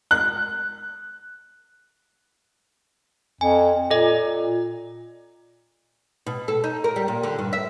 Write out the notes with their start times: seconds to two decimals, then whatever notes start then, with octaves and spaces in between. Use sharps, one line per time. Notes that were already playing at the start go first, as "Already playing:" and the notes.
0.11 F#6
3.41 F2 G#5
3.91 A#2 A4 D#5
6.26 B2
6.48 A4
6.64 D#4
6.84 A#4
6.96 G3
7.08 A#2
7.23 D3
7.39 G2
7.53 E5